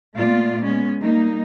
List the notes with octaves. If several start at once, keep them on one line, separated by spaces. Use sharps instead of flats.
A#2 A3 B3 F4 D5
G#3 B3 C#4
G3 A#3 D#4